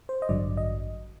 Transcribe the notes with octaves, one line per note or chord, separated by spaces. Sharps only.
C5
D#5
A1 G2 D3 F#3 D5
D#5